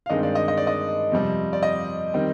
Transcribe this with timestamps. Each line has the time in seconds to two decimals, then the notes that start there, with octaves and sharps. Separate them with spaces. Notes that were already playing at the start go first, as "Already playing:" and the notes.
0.06 F5
0.10 G2 D#3 G#3 C4 D#5
0.23 D5
0.35 D#5
0.48 D#5
0.58 D5
0.67 D#5
1.12 F2 C3 G3 C4
1.53 D5
1.63 D#5
2.14 D#3 G3 C4